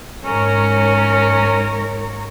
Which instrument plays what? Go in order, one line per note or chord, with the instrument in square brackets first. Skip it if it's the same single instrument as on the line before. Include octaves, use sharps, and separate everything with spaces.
[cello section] G#2 A#4 C#5 [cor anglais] C#4